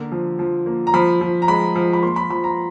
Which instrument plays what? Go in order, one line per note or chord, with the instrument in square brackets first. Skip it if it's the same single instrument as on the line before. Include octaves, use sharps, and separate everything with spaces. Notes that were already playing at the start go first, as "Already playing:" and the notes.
Already playing: [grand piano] D3 A#3
F3
F3
A#3
A#5
F3 B5
F3
A#5
G#3 B5
F3
B5
A#3 C6
B5
F3 B5
A#5